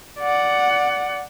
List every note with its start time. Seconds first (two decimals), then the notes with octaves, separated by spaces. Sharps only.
0.20 D5 F#5